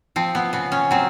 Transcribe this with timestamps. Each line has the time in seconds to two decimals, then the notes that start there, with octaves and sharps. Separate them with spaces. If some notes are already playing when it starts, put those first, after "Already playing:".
0.16 F3 C4
0.35 B3
0.53 C#3 B3
0.72 C#4
0.91 F#3 C4